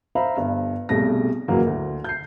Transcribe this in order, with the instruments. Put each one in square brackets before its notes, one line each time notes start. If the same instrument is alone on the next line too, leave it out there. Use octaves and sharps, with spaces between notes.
[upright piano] C5 E5 F5 A#5 B5
G1 G2
B1 C3 G3 A3 G#4 A#6
C#2 F#2 E3 F#3 A#3
D2
G6 C7